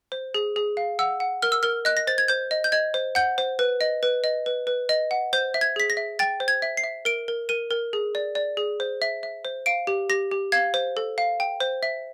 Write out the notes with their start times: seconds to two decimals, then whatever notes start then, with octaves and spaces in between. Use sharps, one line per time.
0.12 C5
0.34 G#4
0.56 G#4
0.77 F5
0.99 F#5 E6
1.20 F#5
1.42 A#4 F6
1.52 E6
1.63 A#4 F6
1.85 D#5 F#6
1.97 A#6
2.07 C5 A6
2.18 G#6
2.28 C5 G6
2.51 D#5
2.64 G6
2.72 D#5 G#6
2.94 C5
3.15 F#5 G6
3.38 C5
3.59 B4
3.81 D#5
4.03 B4
4.24 D#5
4.46 B4
4.67 B4
4.89 D#5
5.11 F#5
5.33 C5 G6
5.54 E5
5.61 G#6
5.76 G#4 B6
5.90 A#6
5.97 E5
6.19 G5 A6
6.40 C5
6.48 G#6
6.62 E5
6.77 C7
6.84 E5
7.05 A#4 D7
7.28 A#4
7.49 A#4 D#7
7.71 A#4
7.93 G#4
8.15 D5
8.35 D5
8.57 G#4
8.80 C5
9.02 E5
9.23 E5
9.45 C5
9.66 F5 D7
9.87 G4
10.10 G4 A#6
10.31 G4
10.52 F5 G#6
10.74 C5
10.97 A4
11.18 F5
11.40 G5
11.60 C5
11.83 E5